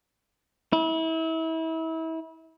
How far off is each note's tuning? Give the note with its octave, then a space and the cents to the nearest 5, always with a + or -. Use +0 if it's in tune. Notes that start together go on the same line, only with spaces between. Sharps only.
E4 -30